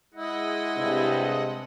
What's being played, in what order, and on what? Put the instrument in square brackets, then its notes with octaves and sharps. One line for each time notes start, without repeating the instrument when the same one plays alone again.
[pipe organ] G#3 D#5 F#5 [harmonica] E4
[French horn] G2 [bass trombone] C3